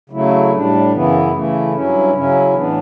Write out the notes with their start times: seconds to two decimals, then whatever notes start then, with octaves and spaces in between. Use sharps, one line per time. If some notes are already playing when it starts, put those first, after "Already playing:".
0.10 C#3 F#3 A3 E4
0.51 A2 G3 D4
0.92 F#2 C#3 E3 B3 E4
1.32 C#3 E3 A3 E4
1.72 G2 F#3 C#4 E4
2.13 C#3 F#3 C#4 E4
2.53 A2 E3 B3 D4